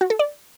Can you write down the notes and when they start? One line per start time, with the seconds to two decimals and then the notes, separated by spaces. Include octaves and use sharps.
0.01 F#4
0.10 A4
0.19 D5